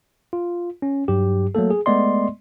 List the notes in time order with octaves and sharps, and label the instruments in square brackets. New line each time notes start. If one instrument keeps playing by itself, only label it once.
[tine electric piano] F4
C#4
G2 F#3 G4
F#3 A3 A#3 A4
G#4
G#3 A3 B3 D5 D#5 C6